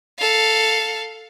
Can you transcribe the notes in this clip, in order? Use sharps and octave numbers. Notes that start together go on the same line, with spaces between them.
A4 F5